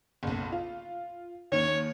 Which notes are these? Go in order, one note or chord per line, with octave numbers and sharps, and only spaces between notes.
F#1 B1
F4
D#2 D#3 C#4 C#5